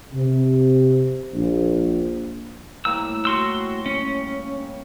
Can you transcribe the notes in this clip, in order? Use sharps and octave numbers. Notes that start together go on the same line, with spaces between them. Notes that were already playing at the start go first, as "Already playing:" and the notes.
C3
A#1
A2 G3 A#3 E6
F#4 C6 E6
C#4